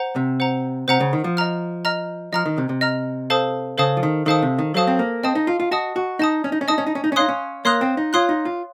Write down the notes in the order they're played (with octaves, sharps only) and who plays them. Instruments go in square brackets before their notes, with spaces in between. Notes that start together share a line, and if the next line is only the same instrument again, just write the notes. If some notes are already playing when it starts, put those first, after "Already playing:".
Already playing: [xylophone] C5 F#5 A#5
[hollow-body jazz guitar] C3
[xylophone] C5 F#5 A#5
[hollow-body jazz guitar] C3 [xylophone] C5 F#5 A#5
[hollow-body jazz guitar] C#3
D#3
F3
[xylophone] D#5 A#5 F6
D#5 A#5 F6
[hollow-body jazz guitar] F3 [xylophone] D#5 A#5 F6
[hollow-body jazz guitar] D#3
C3
C3
[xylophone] D#5 A#5 F6
A4 C5 F5 A5 D#6
[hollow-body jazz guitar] C#3 [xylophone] A4 C5 F5 A5 D#6
[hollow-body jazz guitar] F3
D#3
[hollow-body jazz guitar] D#3 [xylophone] A4 C5 F5 A5 D#6
[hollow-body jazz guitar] C3
D#3
[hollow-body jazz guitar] F#3 [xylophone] A4 C5 F5 A5 D#6
[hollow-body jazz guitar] C4
A#3
[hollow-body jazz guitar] C4 [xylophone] D#5 A5 D#6
[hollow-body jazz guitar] D#4
F4
F4
[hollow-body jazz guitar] F#4 [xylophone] D#5 A5 D#6
[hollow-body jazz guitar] F#4
[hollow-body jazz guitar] D#4 [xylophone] D#5 A5 D#6
[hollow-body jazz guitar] C#4
D#4
C#4
[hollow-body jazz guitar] D#4 [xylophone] D#5 A5 D#6
[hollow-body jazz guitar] C#4
D#4
C#4
D#4
C#4
[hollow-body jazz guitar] D#4 [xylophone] C#5 F5 C6 D#6 F#6
[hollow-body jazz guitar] C#4
[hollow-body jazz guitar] A#3 [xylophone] C#5 F5 C6 D#6 F#6
[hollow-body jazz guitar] C4
D#4
[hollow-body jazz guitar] F4 [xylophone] C#5 F5 C6 D#6 F#6
[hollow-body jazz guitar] D#4
F4